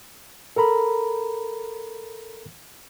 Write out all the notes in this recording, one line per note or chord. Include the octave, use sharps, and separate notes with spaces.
A4 A#4 A#5 B5